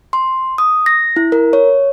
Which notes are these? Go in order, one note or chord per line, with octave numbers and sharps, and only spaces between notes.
C6
D#6
A#6
E4
A#4
C#5